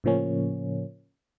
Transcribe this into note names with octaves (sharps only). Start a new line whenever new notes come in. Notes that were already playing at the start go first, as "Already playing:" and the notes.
A2 C#3 F3 A#3 C#4